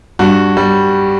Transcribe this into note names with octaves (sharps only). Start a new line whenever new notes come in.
G2 F#4
G3